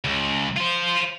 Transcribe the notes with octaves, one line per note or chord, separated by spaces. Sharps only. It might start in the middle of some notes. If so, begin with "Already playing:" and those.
C#2
F4 C5